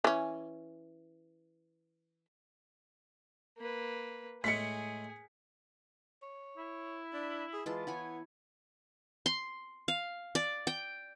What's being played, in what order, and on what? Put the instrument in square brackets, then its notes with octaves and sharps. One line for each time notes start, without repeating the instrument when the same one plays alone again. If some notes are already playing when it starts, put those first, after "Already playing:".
[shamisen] E3 C#4
[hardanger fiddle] A#3 B4
[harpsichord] A2 G#3 [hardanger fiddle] G#4 [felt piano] B6 C#7
[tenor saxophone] C#5
[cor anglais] E4
[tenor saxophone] D4
G#4
[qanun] E3 F4 A5 [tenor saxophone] G#3
[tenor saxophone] B3 [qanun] E4 C#5 G#5
[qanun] C6
F5
D5
G5